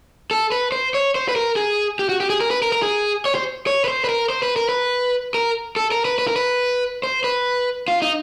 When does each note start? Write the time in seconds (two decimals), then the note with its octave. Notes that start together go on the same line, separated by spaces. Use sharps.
0.31 A4
0.52 B4
0.72 C5
0.94 C#5
1.15 C5
1.29 B4
1.36 A#4
1.56 G#4
1.99 G4
2.09 F#4
2.20 G4
2.30 G#4
2.41 A#4
2.51 B4
2.62 A#4
2.72 A#4
2.83 G#4
3.25 C#5
3.35 C5
3.67 C#5
3.84 B4
3.88 C5
4.04 B4
4.09 A#4
4.30 C5
4.43 B4
4.56 A#4
4.69 B4
5.34 A#4
5.76 A4
5.92 A#4
6.05 B4
6.19 B4
6.28 A#4
6.36 B4
7.03 C5
7.24 B4
7.88 F4
8.02 D#4